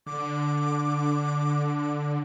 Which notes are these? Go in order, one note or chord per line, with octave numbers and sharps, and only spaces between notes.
D3 D6